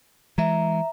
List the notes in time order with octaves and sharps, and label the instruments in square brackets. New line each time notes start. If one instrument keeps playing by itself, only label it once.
[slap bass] E3 G#3 [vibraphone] E5 A#5